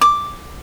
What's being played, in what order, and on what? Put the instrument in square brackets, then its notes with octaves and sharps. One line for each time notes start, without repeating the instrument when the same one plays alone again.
[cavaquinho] D6